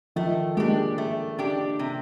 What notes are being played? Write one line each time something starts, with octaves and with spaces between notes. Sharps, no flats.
D#3 F3 A3
G#3 A#3 D4 G4
A3
D4 G4
C3